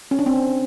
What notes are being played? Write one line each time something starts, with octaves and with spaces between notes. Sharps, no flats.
C#4
D4
C4